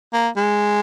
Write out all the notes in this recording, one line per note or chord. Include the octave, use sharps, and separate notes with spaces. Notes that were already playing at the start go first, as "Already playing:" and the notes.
A#3
G#3